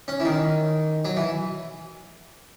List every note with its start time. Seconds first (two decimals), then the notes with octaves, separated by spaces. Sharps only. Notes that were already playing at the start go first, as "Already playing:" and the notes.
0.08 C#4
0.20 E3
0.25 D#3
1.05 F#3
1.17 E3